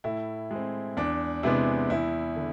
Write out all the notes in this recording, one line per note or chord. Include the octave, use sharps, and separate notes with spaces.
A2 E4
G#3 C4
E2 D4
C3 G#3 B3 D4 E4
E2 E4
D3